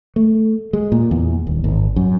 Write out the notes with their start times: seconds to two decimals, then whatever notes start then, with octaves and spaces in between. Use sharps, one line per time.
0.16 A3
0.73 G#3
0.92 A#2
1.11 E2
1.47 D#1
1.64 G#1
1.96 F#2